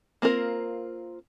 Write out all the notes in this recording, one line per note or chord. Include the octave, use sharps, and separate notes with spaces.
A#3 C4 F4 A#4